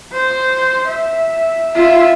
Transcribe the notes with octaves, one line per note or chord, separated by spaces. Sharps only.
C5
E5
F4 E5